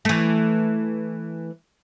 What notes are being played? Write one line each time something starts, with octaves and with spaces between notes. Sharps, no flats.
E3 A3